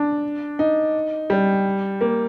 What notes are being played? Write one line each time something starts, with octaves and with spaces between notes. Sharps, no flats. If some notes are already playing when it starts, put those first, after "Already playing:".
Already playing: D4
D#4
G3
A#3